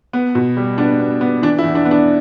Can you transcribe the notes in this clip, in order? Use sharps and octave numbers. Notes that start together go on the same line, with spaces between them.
B3
B2
G3
B3 D4
B3
B3
E3 D4
E4
E2
D4
B3
D4